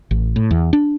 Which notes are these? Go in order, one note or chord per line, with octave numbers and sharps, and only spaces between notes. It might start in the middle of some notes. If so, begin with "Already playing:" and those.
A1
A2
E2
D4